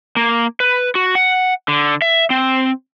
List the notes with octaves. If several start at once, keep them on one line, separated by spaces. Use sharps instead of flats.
A#3
B4
F#4
F#5
D3
E5
C4